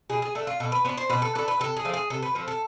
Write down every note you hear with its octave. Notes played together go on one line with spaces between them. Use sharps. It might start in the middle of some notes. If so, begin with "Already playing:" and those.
B2 G#4
G#4
A3 D4 A4
F4
B2 A4
B4
B3 D4 C5
C5
B2 B4
A4
B3 D4 A4
B4
C3 A4
G#4
F3 A3 C4
G#4
C3 A4
B4
F3 A3 C4 A4
A4